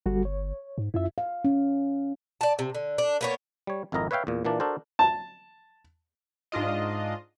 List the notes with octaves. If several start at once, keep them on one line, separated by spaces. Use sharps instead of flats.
G1 G3 F#4 A4
C#5
G#2
F#2 E4 F4 E5
F5
C#4
D5 A5
C3
D3
D4
A#3 B3 C#5
G3 C#5
G#1 F2 E4 A#4 D#5 A#5
B4 C#5 E5 F5 G5
E2 A#2
A#2 E3 A#3 D4 A5
D4 F#4 A4 A#4 C5
A5
G#2 D4 F4 D#5